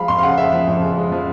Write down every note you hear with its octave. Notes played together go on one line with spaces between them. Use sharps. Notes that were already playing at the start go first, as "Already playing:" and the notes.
Already playing: F3 G#3 F5 B5
F2 C6
F5
C#3 F#5
G#3 E5
F3
F2
C#3
G#3
F3